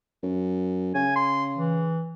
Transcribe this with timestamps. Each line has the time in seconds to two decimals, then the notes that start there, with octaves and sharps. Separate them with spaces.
0.23 F#2
0.95 C#3 G#5
1.16 C6
1.56 E3